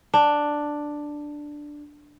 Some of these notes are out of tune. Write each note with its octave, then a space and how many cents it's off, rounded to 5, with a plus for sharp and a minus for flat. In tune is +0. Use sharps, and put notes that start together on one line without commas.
D4 +5